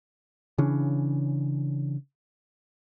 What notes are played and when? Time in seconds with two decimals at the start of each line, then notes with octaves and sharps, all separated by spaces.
0.58 C#3 E3 C#4 D4